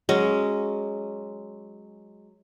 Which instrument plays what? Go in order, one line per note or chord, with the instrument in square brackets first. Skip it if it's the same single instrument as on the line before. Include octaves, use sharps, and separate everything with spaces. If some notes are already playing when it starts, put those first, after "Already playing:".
[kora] F#3 C#4 [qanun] G#3